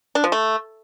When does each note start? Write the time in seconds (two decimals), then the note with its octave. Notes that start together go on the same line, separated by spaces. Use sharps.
0.15 D4
0.24 F3
0.32 A3